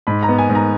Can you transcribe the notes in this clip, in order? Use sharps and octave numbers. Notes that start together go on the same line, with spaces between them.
G#2 B5
A#5
B3
G#5
G#2
A#5